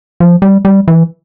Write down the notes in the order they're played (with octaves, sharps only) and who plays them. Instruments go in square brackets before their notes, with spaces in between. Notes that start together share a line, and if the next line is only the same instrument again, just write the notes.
[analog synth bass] F3
G3
G3
E3